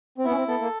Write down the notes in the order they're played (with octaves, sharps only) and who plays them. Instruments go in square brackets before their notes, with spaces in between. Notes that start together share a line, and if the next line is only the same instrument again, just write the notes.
[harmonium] C4
[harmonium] B3 [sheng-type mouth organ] E4
[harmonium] C#4
C4
[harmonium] B3 [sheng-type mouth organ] A4
[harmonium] A#3